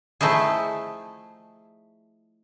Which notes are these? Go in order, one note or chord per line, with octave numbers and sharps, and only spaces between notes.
F3 A3 D#4 E4 G#4